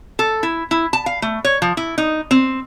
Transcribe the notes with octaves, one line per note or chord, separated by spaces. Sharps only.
A4
E4
E4
A5
F5
A3
C#5
F3
E4
D#4
C4